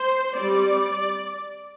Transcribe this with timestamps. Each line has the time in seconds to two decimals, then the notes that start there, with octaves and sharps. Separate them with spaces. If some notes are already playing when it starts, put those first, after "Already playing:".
Already playing: C5
0.35 G3 C4 D5